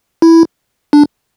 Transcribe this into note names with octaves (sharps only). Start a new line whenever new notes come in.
E4
D4